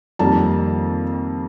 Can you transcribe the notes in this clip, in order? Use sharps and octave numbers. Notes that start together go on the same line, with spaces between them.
F2 D#3 G3 A#3 A5